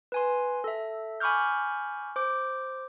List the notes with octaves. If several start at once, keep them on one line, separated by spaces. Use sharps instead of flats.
B4 G#5 C6
A4 E5
G#5 B5 C#6 D6 F6 G6
C5 D6